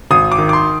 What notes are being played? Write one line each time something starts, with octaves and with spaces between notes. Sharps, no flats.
G#1 D#6
D6
D#3
D6
C6